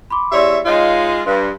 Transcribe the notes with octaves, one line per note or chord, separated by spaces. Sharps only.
B5 C6 D6
E2 G4 C#5 D5 E5 C6
G#3 D#4 F4 C#5 D#5 F5
G2 C6